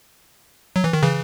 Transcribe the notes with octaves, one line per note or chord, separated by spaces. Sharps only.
F#3
E3
D#3
C#3 E3